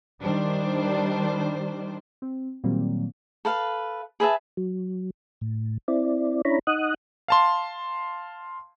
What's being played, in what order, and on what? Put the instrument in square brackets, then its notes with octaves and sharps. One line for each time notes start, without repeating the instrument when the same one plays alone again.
[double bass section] D#3 G3 [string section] D4 C5
[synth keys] C4
A#2 D#3 F#3 G3 A#3 C4
[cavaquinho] A4 B4 F5
G#4 B4 E5 A5
[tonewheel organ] F#3
A2
C4 E4 D5
C#4 D4 E4 C#5 A#5 B5
D#4 D#5 F#5 D#6 F#6
[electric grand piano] F5 A5 C6